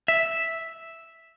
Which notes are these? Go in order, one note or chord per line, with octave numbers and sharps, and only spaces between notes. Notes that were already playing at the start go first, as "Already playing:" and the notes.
E5